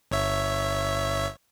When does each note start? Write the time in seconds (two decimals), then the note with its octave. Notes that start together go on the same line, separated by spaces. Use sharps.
0.11 G1 C#5 E5